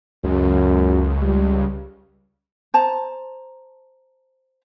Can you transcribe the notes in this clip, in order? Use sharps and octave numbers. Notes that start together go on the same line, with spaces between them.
C#2 F#2
G3
C5 A5 A#5